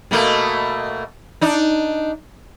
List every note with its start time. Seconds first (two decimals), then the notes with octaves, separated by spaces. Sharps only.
0.11 B2 A3 A#3
1.41 D4 D#4